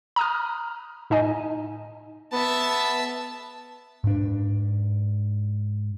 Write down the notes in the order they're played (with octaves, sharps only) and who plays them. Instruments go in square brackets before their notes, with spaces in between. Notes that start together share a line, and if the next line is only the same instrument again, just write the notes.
[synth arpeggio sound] A#5 D#6 F6
A2 D#4 D#5 G#5
[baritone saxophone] B3 [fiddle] E5 A5
[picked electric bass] G#2 D4